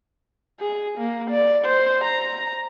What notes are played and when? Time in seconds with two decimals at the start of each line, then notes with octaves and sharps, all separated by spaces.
0.60 G#4
0.98 A#3
1.31 D5
1.65 C5
2.04 A#5